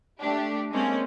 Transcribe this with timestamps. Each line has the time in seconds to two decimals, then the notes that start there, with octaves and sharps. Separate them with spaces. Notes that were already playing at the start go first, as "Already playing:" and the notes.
0.20 A3 D4 G4
0.72 G#3 A#3 C4 C#4